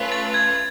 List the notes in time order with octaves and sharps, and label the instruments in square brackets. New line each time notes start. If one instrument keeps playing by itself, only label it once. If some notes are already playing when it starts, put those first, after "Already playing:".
Already playing: [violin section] A3 C#4 F4 B4
[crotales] A6
G#6